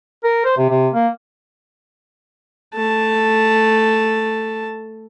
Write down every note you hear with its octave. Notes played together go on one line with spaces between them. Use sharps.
A#4
C5
C3
C3
A#3
A3 A5